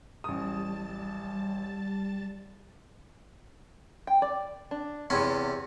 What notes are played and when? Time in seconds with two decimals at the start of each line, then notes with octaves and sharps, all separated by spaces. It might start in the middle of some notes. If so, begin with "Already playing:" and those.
0.24 A1 G3 A5 D#6 A6
4.07 G5
4.22 D5
4.71 D4
5.10 E2 C3 B3 C#4 E4 C#5